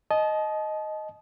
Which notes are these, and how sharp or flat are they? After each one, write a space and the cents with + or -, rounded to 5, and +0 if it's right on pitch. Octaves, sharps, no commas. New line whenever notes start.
D#5 +0 A5 -35